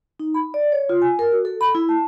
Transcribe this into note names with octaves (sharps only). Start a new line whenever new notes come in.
D#4
B5
D5
C#5
F4
G#5
A#4
F#4
A4
B5
E4
A5